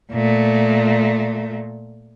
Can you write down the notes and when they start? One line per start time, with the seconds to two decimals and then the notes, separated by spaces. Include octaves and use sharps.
0.13 A#2 A3